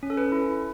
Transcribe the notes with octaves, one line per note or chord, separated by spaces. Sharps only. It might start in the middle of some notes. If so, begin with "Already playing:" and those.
C#4
A4
B4
A4
E4